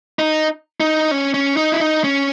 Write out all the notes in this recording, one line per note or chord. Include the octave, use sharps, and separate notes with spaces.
D#4
D#4
C#4
C#4
D#4
E4
D#4
C#4